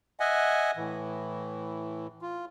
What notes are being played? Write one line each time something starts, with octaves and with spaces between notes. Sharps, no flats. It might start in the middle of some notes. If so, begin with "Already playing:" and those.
D#5 E5 F#5 G#5
A2 E3
F4